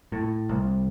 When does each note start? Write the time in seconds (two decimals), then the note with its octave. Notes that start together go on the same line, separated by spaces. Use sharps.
0.12 A2
0.49 C2